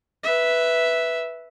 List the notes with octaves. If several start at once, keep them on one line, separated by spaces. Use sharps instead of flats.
B4 E5